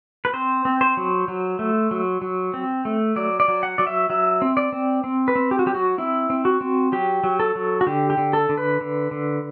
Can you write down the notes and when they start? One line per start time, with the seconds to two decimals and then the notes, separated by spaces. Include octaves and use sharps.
0.25 B4
0.33 C4 C5
0.65 C4
0.81 C5
0.97 F#3
1.28 F#3
1.59 A3
1.91 F#3
2.22 F#3
2.54 C4
2.85 A3
3.16 F#3 D5
3.40 D5
3.48 F#3
3.63 F#5
3.78 F#3 D5
3.87 E5
4.10 F#3 E5
4.42 C4
4.57 D5
4.72 C4
5.04 C4
5.28 B4
5.35 C4
5.51 G4
5.59 F#4
5.66 F#3 G4
5.74 F#4
5.98 C4 E4
6.30 C4
6.45 F#4
6.61 C4
6.92 F#3 G4
7.24 F#3
7.40 A4
7.55 F#3
7.81 F#4
7.87 D3 G4
8.10 G4
8.18 D3
8.33 A4
8.49 D3
8.57 B4
8.81 D3
9.11 D3